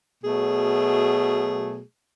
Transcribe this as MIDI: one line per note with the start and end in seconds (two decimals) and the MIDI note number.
0.23 1.81 47
0.23 1.81 54
0.23 1.81 57
0.23 1.81 68